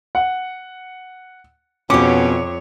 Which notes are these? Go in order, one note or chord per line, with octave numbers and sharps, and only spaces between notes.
F#5
F2 B2 C#4 G4 C#5 D6